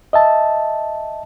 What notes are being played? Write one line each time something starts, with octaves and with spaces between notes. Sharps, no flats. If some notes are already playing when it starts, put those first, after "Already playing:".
D#5 E5 A5